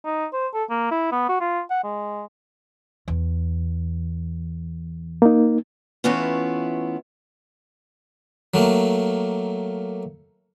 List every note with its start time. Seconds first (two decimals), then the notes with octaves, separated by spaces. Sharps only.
0.05 D#4
0.33 C5
0.54 A4
0.70 A#3
0.91 E4
1.12 B3
1.29 F#4
1.41 F4
1.70 F#5
1.84 G#3
3.08 E2
5.22 A#3 D#4
6.04 E3 A3 B3 C#4 E4 F4
8.54 F#3 A3 A#3